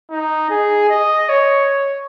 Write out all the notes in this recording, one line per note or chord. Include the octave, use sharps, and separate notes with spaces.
D#4
G#4
D#5
C#5